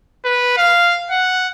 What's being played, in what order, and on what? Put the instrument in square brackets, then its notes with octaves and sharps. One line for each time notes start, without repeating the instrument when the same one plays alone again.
[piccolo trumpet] B4
F5
F#5